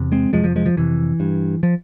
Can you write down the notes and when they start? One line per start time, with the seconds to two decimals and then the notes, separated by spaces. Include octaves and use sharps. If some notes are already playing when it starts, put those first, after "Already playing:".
Already playing: E2 C3
0.12 G#3 C4
0.33 F2 C3 F3 G#3
0.44 F3
0.56 F3 G#3
0.66 F3
0.77 F2 C3 E3
1.20 G2
1.63 F3